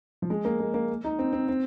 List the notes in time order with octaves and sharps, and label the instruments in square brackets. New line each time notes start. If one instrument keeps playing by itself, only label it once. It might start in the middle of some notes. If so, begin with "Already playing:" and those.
[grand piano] F3
G#3
A#3
G#3
A#3
D#4
C4
C4
C4